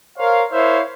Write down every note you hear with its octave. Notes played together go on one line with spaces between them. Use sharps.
A#4 C5 C#5 F5
E4 A#4 C5 C#5 E5 F5